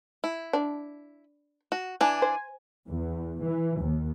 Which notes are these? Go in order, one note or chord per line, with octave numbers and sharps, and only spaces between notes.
E4
D4
F#4
E3 D4 G#5
C5
E2
E3
D#2